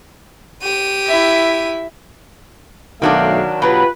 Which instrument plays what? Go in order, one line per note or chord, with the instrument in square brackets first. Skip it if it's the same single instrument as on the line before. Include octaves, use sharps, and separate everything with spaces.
[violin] G4 D#7
[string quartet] E4 E5
[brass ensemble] B1 A3 F5 [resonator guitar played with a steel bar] D#3 F#3 D4
[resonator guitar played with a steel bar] B2 F#3 [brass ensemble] F4 G4 B4